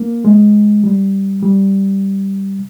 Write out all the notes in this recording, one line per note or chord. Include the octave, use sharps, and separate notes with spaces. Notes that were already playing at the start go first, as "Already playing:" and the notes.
Already playing: A#3
G#3
G3
G3